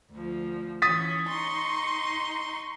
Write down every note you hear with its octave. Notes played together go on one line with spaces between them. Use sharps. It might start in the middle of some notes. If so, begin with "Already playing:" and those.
D2 F3
E3 C#4 D#6 A6 B6
D#4 C6 C#6